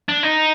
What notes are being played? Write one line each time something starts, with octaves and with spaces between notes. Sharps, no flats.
D4
D#4